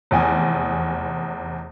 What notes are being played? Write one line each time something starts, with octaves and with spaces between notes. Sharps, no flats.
F1 E2 G#5